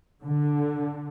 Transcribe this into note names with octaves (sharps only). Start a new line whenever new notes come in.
D3